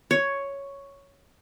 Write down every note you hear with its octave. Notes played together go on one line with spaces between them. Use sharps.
C#5